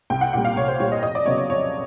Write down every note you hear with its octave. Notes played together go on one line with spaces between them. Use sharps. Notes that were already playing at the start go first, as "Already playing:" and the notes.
C2 G5
F#5
A#2 G3 F#5
F5
C2 C#5
C5
A#2 G3 C#5
D#5
F2 D#5
D5
C#3 F#3 B3 C#5
C#5
F2 C#5